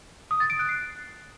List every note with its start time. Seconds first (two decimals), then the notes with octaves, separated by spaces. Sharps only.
0.31 D#6
0.40 A6
0.50 D7
0.59 F#6
0.69 C7